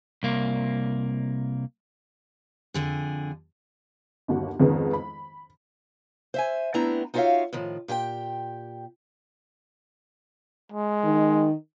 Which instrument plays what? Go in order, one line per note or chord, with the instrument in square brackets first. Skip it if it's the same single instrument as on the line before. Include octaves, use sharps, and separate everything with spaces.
[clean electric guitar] C2 A#3
[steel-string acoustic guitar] F2 D3 G#4
[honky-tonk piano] G1 D#2 F#4 F#5
F2 G#2 D#3 G#3 B3 C#4
B5
[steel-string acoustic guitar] C5 E5 G#5
A3 B3 C4 D4 E4 A#5
D#4 F4 F#4 C#5 E5 F5
A2 D#3 F3
A#2 G4 G#4 G5
[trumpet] G#3
[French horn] D#3